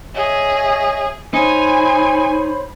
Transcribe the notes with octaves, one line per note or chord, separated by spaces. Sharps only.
G#4 C#5 D#5 E5
D#4 C5 C#5 G#5 B5